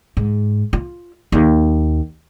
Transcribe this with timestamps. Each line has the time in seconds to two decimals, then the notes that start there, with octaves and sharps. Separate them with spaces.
0.17 G#2
0.73 F4
1.32 D#2